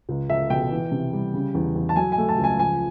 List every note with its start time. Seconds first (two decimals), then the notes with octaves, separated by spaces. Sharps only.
0.09 C#2
0.29 C#2 E5
0.50 B2 G5
0.71 E3
0.92 C3
1.13 G3
1.34 C#3
1.55 E2
1.75 E2
1.89 A5
1.96 F#3 G#5
2.12 G#5
2.18 A3
2.29 A5
2.38 C#2
2.44 G#5
2.59 F3 G#5